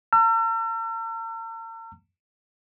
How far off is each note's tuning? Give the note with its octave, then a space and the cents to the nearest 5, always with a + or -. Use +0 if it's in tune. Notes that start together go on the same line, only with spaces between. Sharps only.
A#5 -45 E6 +45